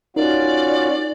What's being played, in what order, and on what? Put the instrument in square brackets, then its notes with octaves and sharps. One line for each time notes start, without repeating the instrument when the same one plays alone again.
[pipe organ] C#4 F4 F#4 [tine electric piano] D#4 A#4 [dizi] D5